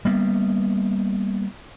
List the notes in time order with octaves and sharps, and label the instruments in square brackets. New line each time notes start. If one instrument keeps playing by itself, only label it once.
[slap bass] G3 A#3 B3